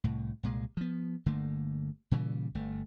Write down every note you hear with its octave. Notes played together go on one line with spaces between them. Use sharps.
C2 A2
C2 A#2 G#3
F3 B3
G1 D3 A3 A#3
A#2 C#3 E3 G3
G1 A3